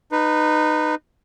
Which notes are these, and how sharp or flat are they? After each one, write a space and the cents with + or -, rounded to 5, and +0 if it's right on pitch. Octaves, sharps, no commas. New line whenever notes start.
D#4 -20 B4 +0